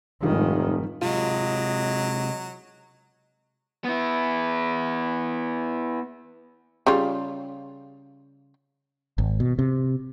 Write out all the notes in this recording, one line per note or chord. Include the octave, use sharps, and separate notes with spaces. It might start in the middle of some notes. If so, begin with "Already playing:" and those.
F1 G#2 D#3 F3 G3 D4
C3 F#3 G#3 F4 D#5
B3 E4
C#3 G3 F4
G#1
B2
C3